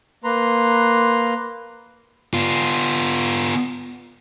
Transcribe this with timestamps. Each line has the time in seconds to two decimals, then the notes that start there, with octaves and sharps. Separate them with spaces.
0.24 A#3 B4 A#5 C6
2.34 B3 F4